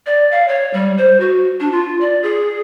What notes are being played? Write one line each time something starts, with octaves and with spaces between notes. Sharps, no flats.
D5
F5
C#5
G3
C5
F#4
D4
F4
D5
G#4